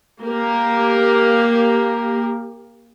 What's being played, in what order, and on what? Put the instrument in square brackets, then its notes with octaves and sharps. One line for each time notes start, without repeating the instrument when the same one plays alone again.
[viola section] A#3 G4 A#4